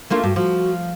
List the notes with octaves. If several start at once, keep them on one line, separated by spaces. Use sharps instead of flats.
A3 A#3 D4 F4
G2 F#4
F3 F#4